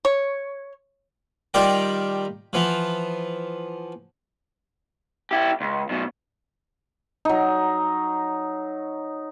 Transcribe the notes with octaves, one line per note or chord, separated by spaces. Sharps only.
C#5
D#3 G3 F4 A#4 D5 G5
E3 F3 B3
E4 G4
C#2
F#2 B2
F#3 D#4